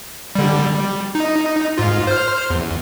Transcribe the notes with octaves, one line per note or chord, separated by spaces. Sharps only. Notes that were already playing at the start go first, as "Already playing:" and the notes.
D3 G3
G3
D#4
G#2 F4
C5 F6
E2